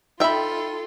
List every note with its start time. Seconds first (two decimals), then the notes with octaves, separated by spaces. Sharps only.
0.20 D#4 F4 A4 E5 G5 B5